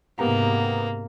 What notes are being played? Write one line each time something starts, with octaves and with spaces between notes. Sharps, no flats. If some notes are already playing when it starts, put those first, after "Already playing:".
G#2 C3 A#3 B3 G4 A#5